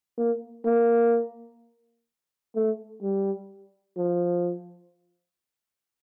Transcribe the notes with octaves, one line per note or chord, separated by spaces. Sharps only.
A#3
A#3
A3
G3
F3